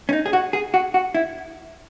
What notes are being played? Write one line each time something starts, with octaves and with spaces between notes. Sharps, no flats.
C#4
D#4
G#4
F#4
G#4
F#4
F#4
E4